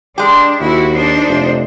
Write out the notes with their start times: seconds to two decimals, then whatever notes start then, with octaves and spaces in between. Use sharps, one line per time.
0.18 G#3 D4 G4
0.61 D#2 E4 F#4
0.93 D4 D#4 C5
1.28 F1